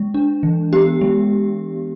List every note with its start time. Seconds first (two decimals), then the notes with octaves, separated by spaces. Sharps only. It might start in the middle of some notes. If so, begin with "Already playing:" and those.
Already playing: G#3
0.14 D4
0.43 E3
0.73 B3 G4
1.01 G#3